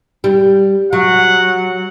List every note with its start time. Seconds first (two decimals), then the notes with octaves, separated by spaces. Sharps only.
0.24 G3
0.93 F#3 F#5